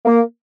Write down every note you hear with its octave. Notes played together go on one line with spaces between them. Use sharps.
A#3